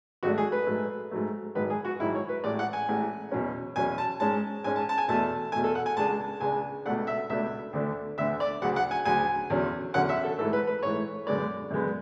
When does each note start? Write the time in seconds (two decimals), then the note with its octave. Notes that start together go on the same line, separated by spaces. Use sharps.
0.23 G#1 G#2 F#3 A3 D4 F#4
0.38 G#4
0.52 B4
0.67 G#2 F#3 A3
1.11 G#2 F#3 A3
1.55 G#1 G#2 F#3 B4
1.70 G#4
1.85 F#4
1.99 G#1 G#2 F#3 E4
2.15 C#5
2.29 B4
2.44 A1 A2 G#3 D5
2.59 F#5
2.73 G#5
2.88 A1 A2 G#3
3.31 E2 B2 F#3 C#4
3.76 E2 B2 F#3 C#4 G#5
3.98 A5
4.20 G#2 G#3 C#4 A5
4.64 G#2 G#3 C#4 G#5
4.76 A5
4.89 A5
4.98 G#5
5.08 E2 B2 A3 A5
5.52 E2 B2 A3 G#5
5.64 A4
5.75 F#5
5.86 G#5
5.97 C#2 C#3 G#3 D4 A5
6.40 C#2 C#3 G#3 D4 G#5
6.85 C#2 B2 A3 D4 F#5
7.07 E5
7.30 C#2 B2 A3 D4 E5
7.73 D2 D3 A3 D4
8.18 D2 D3 A3 D4 E5
8.40 D5
8.62 D2 C#3 F#3 F#5
8.76 F#5
8.91 G#5
9.05 D2 C#3 F#3 G#5
9.50 E2 D3 F#3 C#4
9.94 E2 D3 F#3 C#4 F#5
10.09 E5
10.24 A4
10.38 G#2 E3 A3 A4
10.53 B4
10.67 B4
10.82 G#2 E3 A3 C#5
11.26 F#2 D3 G#3 B3 D5
11.70 F#2 D3 G#3 B3